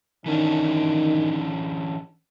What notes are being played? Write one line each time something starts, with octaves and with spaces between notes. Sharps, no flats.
D#3 E3 C#4 D4